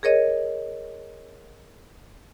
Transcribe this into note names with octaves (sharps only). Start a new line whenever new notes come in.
G#4 A#4 C#5 D#5